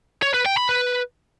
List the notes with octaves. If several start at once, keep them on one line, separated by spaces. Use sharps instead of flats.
C#5
B4
G5
B5
B4